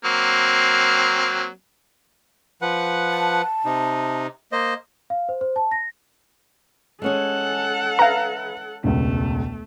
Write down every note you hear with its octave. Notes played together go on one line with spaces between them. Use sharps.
F#3 A#3 C4
F3 B4 F#5
A5
C3 D#4
A#3 C5 D#5
F5
C5
C5
A5
A#6
G#3 C#4 G#4 A4 F#5
B4 E5 F5 A#5
E1 C#2 A3